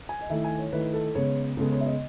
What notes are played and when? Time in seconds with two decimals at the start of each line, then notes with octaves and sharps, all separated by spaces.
0.09 G#5
0.21 D#5
0.30 D#3 A3 E4 E5
0.44 G#5
0.59 C#5
0.72 D#3 A3 E4 B4
0.94 A4
1.15 C#3 G#3 B3 C#5
1.57 C#3 G#3 B3 A4
1.72 C#5
1.81 E5
1.86 D#5